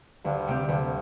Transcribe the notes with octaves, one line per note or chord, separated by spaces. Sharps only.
D2 G2
C3 A3 C4 G4
D2 G2